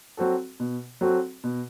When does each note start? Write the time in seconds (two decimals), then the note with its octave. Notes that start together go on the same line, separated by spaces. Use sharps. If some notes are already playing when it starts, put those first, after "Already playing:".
0.17 F#3 C4 F#4 A4
0.60 B2
1.01 F#3 C4 F#4 A4
1.44 B2